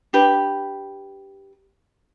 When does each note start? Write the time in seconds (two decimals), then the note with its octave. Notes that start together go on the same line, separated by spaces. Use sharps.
0.13 D4 G4 B4